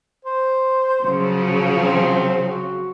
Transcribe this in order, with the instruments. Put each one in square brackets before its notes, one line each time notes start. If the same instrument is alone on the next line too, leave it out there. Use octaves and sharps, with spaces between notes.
[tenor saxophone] C5
[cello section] C#3 F3 F#3
[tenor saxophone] C4
F#4